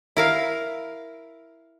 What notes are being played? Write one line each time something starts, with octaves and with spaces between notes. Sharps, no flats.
E4 A#4 F5